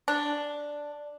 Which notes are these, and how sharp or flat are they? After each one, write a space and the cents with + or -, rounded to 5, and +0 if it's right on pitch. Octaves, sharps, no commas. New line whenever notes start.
D4 +0